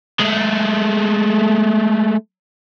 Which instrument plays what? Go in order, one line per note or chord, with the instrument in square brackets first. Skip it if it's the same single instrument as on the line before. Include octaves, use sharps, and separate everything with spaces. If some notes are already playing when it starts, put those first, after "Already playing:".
[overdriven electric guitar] G#3 A3